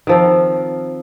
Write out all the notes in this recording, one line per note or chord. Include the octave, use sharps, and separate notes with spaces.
D#3 F3 C4